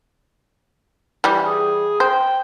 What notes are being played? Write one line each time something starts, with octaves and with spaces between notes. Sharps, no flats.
E3 G3
G#4
C5 G5